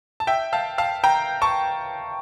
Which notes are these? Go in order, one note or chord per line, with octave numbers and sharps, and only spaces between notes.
A5
E5 G5
F5 A5
F5 A5
G5 A#5
A5 C#6